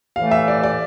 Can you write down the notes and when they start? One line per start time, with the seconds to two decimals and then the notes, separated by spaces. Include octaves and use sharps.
0.15 A2 E3 A3 F5
0.31 E5
0.48 D5
0.63 D5